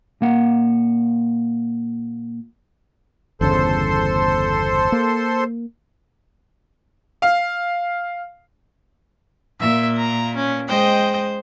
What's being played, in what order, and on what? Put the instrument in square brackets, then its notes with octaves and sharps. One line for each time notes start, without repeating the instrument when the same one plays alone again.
[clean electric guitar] A#2 A#3 F#5
[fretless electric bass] G1 E2 C#3 [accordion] A4 C5 C6
[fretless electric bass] A#3
[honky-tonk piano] F5
[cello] A#2 A#3 [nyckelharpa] E5
[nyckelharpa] A#5
C#4
[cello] G#3 C5 [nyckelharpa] D#5 G5